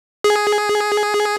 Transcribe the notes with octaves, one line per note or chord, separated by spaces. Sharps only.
G#4